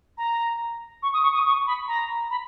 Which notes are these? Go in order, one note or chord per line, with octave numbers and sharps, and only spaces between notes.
A#5
C#6
D#6
C#6
D#6
C#6
B5
A#5
B5